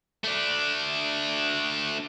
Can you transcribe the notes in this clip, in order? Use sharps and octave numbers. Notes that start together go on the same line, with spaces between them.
A3 D4